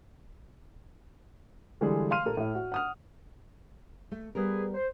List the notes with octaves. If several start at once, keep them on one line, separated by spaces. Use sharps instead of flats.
D3 E3 G3 G#3 G#4
F5 C6 F6 D#7
A#2 A#3 A4
A2 E4
F#4
F#5 D#6 F6
A3
G3 B3 G#4 A#4 B4
C5